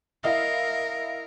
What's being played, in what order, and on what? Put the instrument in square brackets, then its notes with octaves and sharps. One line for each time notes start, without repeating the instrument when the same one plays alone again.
[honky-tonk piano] E4 D#5 F5 [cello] A#4